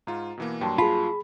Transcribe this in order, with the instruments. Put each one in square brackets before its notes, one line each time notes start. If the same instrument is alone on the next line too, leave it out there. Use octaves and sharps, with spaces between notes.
[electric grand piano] G#2 F4 [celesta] A#5
[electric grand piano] B2 E3 A#3
[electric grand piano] G2 F#3 A#3 [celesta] G5 A5 C6
[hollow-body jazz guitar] F4 [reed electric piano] G#4 B5 [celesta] A5